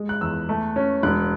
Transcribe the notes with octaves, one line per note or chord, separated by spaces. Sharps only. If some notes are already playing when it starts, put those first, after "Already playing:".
Already playing: G#3
F#6
E2 E6
A3
C#4
E1 F#6